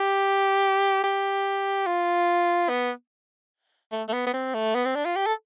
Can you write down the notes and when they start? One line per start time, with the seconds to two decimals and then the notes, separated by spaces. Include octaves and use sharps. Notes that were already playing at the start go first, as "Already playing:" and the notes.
Already playing: G4
1.04 G4
1.86 F4
2.69 B3
3.92 A3
4.09 A3
4.13 B3
4.27 B3
4.34 C4
4.54 A3
4.75 B3
4.85 C4
4.95 D4
5.06 F4
5.16 G4
5.26 A4